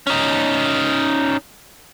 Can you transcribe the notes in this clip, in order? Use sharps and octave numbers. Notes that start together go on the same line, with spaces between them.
C#4 D#4